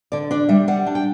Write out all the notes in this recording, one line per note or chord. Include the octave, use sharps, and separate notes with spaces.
D3 D5
D4 D5
G3 E5
G3 F#5
D4
G5